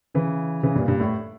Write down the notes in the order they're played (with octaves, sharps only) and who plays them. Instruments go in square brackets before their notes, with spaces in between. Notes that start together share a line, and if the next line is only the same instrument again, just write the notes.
[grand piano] C#3 E3
C#3 E3
G2 A#2
G2 A#2
A2